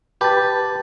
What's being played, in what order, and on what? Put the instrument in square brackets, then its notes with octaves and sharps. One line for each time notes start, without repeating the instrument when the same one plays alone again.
[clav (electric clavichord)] G4 [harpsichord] B4 [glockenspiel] A5 A6